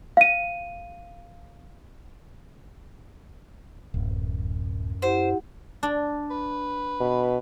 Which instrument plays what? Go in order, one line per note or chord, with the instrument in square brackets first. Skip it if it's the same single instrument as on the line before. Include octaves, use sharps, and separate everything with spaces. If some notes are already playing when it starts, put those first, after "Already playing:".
[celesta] F5 D#7
[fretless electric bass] D1 [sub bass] F#2
[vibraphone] E4 G4 F#5 [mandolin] C5
[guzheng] D4
[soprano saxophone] B4
[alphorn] B2